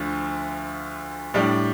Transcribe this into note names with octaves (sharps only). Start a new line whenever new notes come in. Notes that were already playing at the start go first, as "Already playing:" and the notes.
Already playing: D2 D3 F3
A2 G3 D4